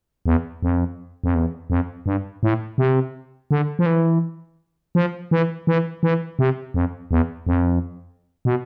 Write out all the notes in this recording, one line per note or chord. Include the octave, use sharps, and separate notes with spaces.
E2
F2
F2
E2
F2
G2
A2
C3
D3
F3
E3
F3
E3
E3
E3
C3
F2
E2
F2
B2